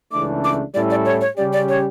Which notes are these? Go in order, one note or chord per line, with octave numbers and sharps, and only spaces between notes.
C#2 C#3 E3 A3 D4 D6
D6
A2 G3 C#4 E4 A4 D5
D5
C#5
C#5
C#3 G3 C#4 G4 D5
D5
C#5